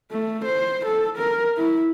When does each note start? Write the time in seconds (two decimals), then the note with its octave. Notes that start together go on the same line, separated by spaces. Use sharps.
0.11 A3
0.45 C5
0.86 A4
1.18 A#4
1.57 E4